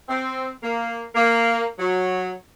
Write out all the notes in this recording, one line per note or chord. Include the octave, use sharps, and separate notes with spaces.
C4
A#3
A#3
F#3